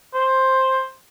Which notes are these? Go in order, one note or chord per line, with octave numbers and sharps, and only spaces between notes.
C5